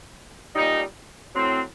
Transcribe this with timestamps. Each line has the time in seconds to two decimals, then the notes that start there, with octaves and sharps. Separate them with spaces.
0.55 A#2 G3 D#4
1.35 A2 F#3 C4